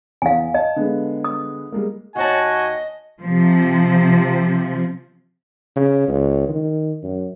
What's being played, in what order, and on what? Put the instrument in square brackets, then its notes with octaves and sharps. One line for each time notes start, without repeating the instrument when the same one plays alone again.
[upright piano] E2 [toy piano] F5 G#5
[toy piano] D#5 [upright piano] A5
[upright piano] D3 G#3 B3
[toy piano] D#6
[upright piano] G3 G#3 A#3
[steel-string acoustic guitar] D#2 C#5 A5 [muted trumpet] F#4 [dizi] D#5 [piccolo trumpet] G#5
[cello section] C3 F3
[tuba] C#3
C#2
D#3
F#2